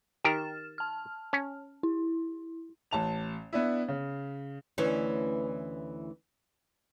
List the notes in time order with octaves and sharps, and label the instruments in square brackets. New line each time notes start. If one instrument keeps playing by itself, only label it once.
[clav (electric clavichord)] D#3 G4 A#4 [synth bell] F6 A6 E7
[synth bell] A5 F6
[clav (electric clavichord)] C#4
[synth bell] E4
[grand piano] A1 A5 F7
B3 D4 E4
C#3
[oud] D2 E3 C#4